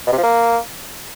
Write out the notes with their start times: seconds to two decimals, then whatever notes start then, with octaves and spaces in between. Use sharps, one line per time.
0.07 B2
0.12 C3
0.18 F3
0.23 A#3